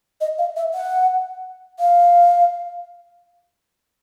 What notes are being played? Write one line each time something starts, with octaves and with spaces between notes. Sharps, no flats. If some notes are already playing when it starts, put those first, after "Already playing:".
D#5
F5
E5
F#5
F5